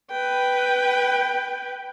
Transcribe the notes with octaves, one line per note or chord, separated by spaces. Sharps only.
B4 G5